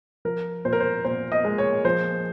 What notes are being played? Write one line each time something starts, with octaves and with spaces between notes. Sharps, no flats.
F3 A#4
A#2 C5
A#4
C5
A#2 C5
D#5
G#3
C#5
F3 C5